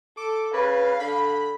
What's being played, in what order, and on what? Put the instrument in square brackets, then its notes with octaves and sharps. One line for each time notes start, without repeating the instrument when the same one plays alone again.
[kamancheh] A4 [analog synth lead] D6
[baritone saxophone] C#3 [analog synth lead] B4 [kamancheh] F5
[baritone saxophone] D3 [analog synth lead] B5